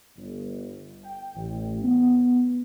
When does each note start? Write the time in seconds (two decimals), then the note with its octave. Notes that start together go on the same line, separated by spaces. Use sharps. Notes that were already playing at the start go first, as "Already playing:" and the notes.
0.17 G1
1.03 G5
1.35 A1
1.83 B3